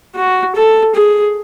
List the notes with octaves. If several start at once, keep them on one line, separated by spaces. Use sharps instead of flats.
F#4
A4
G#4